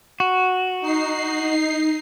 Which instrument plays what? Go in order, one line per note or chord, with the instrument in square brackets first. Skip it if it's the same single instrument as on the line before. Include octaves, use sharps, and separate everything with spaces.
[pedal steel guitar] F#4
[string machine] D#4 C7